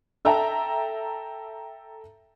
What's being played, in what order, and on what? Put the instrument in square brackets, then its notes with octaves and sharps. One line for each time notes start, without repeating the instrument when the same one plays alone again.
[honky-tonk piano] A4 E5 G5 A5 A#5